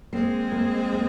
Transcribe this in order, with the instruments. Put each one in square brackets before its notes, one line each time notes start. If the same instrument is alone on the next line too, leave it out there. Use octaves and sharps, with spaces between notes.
[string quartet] G#3 C4 [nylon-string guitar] A#3
[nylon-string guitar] A#3
A#3